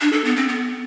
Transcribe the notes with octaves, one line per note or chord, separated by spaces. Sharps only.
D4
A4
B3
C4
B3